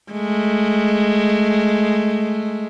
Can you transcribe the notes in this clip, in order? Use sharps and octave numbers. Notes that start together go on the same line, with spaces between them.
G#3 A3